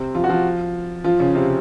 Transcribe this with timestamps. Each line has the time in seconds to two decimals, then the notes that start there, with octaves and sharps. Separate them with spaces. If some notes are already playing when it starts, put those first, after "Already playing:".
Already playing: C3 C4
0.15 F3 F4
0.24 F#4
0.29 F3 F4
1.04 F3 F4
1.20 C#3 C#4
1.35 C3 C4